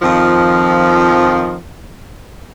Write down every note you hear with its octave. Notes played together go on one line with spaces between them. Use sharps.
F2 D#3 F3